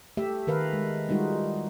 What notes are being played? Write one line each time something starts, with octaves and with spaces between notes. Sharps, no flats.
A3 G4 E5
D#3 A#4 B4 F5
G#3
G3 G#3 D#4 F4 F#4